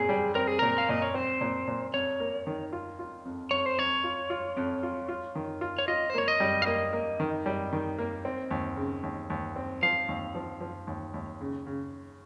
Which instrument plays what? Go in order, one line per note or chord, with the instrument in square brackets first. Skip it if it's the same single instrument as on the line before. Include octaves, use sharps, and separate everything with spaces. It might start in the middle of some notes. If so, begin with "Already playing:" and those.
Already playing: [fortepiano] A#2 C4 [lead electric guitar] G#4
[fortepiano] G3
[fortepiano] C4 [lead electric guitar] A#4
[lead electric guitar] G#4
[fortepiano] A#2 [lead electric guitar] A#4
[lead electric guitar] F5
[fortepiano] A#2 [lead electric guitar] D#5
[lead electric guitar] C#5
[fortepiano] C4 [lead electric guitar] C5
[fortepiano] A#2
A#2
[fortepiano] F2 [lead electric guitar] C#5
[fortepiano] A#3
D#3
F4
F4
F2
[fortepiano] F2 [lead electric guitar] C#5
[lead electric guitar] C5
[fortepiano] F2 [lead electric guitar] C#5
[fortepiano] F4
F4
F2
F4
F4
D#3
F4
[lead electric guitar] C#5
[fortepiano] F4 [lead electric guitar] D#5
[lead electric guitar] C5
[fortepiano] A#3 [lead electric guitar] C#5
[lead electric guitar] D#5
[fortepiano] G3
[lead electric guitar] F5
[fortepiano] A#3 [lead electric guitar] D#5
[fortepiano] A#3
D#3
G3
D#3
A#3
C4
D#2
C#3
D#2
D#2
C4
[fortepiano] F3 [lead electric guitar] F5
[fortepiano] D#2
F3
F3
D#2
D#2
C#3
C#3